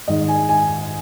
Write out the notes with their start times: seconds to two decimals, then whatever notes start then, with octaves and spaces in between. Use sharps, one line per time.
0.08 G#2 D#3 D#5
0.28 G#5
0.49 G#5